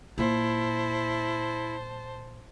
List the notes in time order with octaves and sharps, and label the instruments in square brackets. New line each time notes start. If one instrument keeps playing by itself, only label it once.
[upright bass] A#2 [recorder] E4 [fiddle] C5 A5